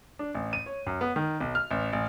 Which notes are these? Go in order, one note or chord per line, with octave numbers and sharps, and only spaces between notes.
D4
A1
D#7
C#5
F#2
B3
D#3
B1
F6
A1
A1